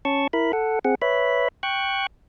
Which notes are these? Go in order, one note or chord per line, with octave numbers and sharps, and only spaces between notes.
C#4 A5 C#6
E4 A#4 B5
A4 F#5
C4 G#4 F#5
B4 C#5 E5 B5
G5 C#6 F#6